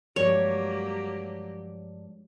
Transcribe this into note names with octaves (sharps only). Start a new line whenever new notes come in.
G2 F3 F#3 G#3 A#3 G4 C#5